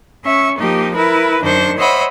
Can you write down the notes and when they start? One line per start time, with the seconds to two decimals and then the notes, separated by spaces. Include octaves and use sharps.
0.24 C#4 E5 C#6
0.60 F3 A#3 D#4 G4
0.95 E4 A#4 B4
1.42 F#2 D#3 D4 C5 C#6
1.77 C5 C#5 D#5 E5 F#5 B5